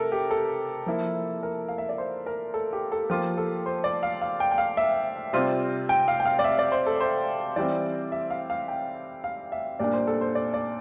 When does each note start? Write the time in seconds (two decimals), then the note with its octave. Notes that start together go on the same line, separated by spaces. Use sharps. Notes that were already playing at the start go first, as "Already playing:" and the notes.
Already playing: C3 A4 A#4
0.12 G4
0.31 A4
0.86 F3 A#3 E4
1.43 A#4
1.68 F5
1.78 E5
1.89 D5
1.98 C5
2.26 A#4
2.54 A4
2.73 G4
2.92 A4
3.10 F3 A#3 F4 G4
3.38 A4
3.66 C5
3.84 D5
4.03 F5
4.21 F5
4.40 G5
4.52 G5
4.58 F5
4.77 E5
5.33 C3 G3 C4 F4
5.89 G5
6.08 F5
6.20 G5
6.25 F5
6.39 D5
6.44 E5
6.59 D5
6.72 C5
6.86 A4
7.00 C5
7.56 E3 G3 C4 D5
8.12 E5
8.30 F5
8.50 F5
8.68 G5
9.24 F5
9.52 E5
9.79 A#2 G3 A#3 D4 D5
9.94 C5
10.07 A4
10.21 C5
10.35 D5
10.54 D5